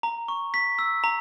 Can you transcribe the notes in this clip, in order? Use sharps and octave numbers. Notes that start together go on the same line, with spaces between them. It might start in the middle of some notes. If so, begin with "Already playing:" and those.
A#5
C#6
B6
E6
A#5